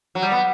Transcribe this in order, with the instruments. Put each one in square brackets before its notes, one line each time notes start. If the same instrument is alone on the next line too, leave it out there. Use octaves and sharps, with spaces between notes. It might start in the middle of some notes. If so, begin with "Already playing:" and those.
[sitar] F#3
G3
B3